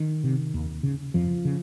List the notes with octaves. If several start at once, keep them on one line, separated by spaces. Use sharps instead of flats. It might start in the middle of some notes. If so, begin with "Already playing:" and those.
Already playing: D#3
C3
D#2
C#3
F2 F3
C#3